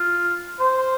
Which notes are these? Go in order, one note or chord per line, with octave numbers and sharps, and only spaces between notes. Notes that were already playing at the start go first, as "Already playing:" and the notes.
Already playing: F4
C5